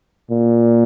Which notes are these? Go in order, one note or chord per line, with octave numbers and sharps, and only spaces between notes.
A#2